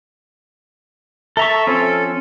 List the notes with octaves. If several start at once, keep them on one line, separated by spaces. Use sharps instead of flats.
A4 E5 A#5 C#6
F3 C4 C#4 A4